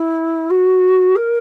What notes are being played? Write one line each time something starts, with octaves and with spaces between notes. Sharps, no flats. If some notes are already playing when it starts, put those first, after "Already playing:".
Already playing: E4
F#4
A#4